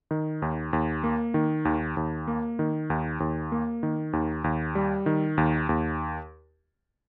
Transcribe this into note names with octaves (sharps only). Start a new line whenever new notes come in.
D#3
D#2
D#2
A#3
D#3
D#2
D#2
A#3
D#3
D#2
D#2
A#3
D#3
D#2
D#2
G3
D#3
D#2
D#2